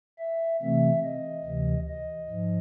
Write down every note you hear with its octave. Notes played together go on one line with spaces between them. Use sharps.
E5
C3 E3 A3 C4 E5
D#5
D2 C3 E3
D#5
G#2 F3